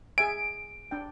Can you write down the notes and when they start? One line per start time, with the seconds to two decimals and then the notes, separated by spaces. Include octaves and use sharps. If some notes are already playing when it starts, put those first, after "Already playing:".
0.18 G#4 E5 G#5 D7
0.91 D4 G5